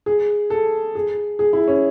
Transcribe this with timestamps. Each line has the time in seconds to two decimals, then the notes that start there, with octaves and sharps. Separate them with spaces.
0.06 G#4
0.50 A4
0.95 G#4
1.39 G#4
1.53 E4
1.68 C#4